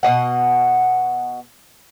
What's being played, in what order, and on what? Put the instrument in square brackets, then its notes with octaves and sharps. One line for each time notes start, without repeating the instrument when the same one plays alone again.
[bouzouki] B2 C4 D#5 F#5